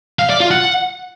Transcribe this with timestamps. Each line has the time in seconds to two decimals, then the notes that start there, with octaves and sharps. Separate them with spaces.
0.19 F5
0.30 D5
0.40 F4
0.51 F#5